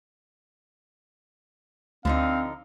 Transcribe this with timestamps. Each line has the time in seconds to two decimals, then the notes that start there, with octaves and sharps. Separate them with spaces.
2.05 D2 D3 F3 C4 D#4 F5